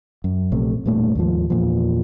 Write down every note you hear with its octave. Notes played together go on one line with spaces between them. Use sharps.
F#2
A#1 C3 A3
E1 G2 A#2 A3
D#2 G#2 F3
E2 A#2 F3